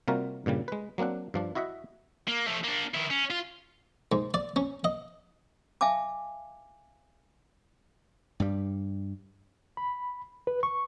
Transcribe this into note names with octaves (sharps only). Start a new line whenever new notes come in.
C3 G3 A#3 F4 F#4 A#4
G2 A#2 C#3 G3
G#3 B4
F#3 A#3 C4 D4 F#5
G2 F3 D4
E4 F#4 D#5 E5 F#5
A#3
F3 A3
A#3 D4
D#3 E4
C#4
F4
G#2
D5
C#4
D#5
E5 F5 G#5 A5 D6
G2 G3
B5
B4
C#6